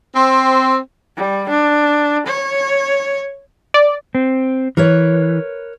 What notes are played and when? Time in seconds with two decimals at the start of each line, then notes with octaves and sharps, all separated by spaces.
0.15 C4
1.17 G3
1.49 D4
2.26 C#5
3.74 D5
4.15 C4
4.77 E3 A#4 B4 C#5